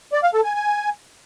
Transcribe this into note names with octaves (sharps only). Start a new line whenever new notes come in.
D5
F5
A4
G#5
G#5